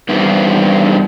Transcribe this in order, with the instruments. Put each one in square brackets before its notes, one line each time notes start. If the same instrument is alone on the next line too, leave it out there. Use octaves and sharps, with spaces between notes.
[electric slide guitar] G2 D#3 E3 B3 C4